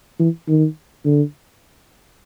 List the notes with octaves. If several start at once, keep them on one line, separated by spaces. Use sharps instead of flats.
E3
D#3
D3